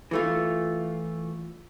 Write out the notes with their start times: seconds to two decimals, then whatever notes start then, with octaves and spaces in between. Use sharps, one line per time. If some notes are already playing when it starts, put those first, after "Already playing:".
0.11 E3 A3 F4